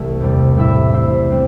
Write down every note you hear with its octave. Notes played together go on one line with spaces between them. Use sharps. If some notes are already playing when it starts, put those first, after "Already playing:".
Already playing: C2 E3 A3
E2 C3 G3
A2 G3 E4 A4 E5
G3 E4 C5 E5
G3 C4